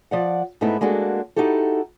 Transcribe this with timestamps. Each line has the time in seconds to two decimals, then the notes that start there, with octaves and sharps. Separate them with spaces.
0.11 F3 D5 F#5
0.61 G#2 A3 B3 D#4 E4
0.81 G#3 A#3 D4 F#4 A4
1.36 D#4 E4 F#4 G4 A4